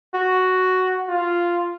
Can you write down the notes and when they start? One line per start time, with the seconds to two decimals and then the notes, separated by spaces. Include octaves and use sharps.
0.14 F#4
1.08 F4